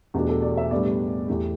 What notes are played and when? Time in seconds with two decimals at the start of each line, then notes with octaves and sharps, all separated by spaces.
0.14 E2 B2 A3 D4 G4
0.29 A4
0.42 D5
0.57 E5
0.71 A2 G3 B3 D4 D5
0.85 G4
1.28 E2 E3 A3 G4